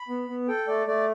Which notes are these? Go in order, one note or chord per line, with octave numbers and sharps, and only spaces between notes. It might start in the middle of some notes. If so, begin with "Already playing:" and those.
Already playing: B5
B3
B3
A4 G5
A3 D5
A3 D5